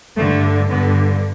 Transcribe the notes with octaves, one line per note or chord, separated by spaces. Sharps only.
G2 D3 A3
G2 D3 B3